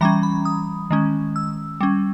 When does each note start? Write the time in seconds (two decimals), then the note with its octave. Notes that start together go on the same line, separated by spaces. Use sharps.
0.01 E3 G3 C#4 A#5
0.23 B5
0.45 D#6
0.91 D#3 G#3 C#4
1.36 E6
1.81 G3 C#4